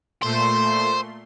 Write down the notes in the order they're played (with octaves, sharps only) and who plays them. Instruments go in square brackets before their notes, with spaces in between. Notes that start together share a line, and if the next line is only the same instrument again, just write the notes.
[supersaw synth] A#2 A3 C6 [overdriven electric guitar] C5